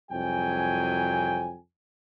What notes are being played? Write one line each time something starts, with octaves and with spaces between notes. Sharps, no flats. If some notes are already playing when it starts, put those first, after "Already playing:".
C2 F2 F#3 G5 G#5